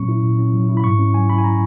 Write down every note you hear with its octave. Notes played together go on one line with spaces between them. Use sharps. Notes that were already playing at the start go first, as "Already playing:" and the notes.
Already playing: A#2 F#3 C#4 C#6
E4
A#2
C#4
F#3
E4
B5
G#2 C#6
C#4
F#3 G#5
E4 B5
G#5
A#5